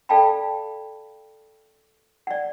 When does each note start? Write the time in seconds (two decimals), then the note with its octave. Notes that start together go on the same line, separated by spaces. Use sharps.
0.09 A4 D5 F5 G5 A5 B5
2.27 D5 F#5